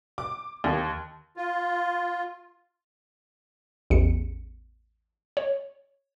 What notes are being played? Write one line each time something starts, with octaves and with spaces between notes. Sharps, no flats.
D6
D#2
F4
A1 E2 C#7
C#5